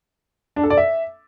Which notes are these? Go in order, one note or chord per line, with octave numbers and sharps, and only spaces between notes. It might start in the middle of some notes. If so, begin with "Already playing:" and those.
D4
A4
D5
E5